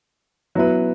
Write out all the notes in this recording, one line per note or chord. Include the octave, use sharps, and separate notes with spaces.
F#3 B3 E4 B4